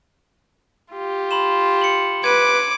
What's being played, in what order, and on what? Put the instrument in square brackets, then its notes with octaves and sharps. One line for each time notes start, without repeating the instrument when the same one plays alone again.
[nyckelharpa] F4 G4
[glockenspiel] B5 C6 E7
C#7 F#7
[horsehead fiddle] B4 [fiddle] D6 [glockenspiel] G#6 D#7